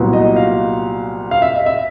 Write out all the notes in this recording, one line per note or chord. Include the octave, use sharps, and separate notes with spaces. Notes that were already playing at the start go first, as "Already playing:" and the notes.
Already playing: C2 A#2 F#3 B3
D#5
F5
F5
E5
D#5
E5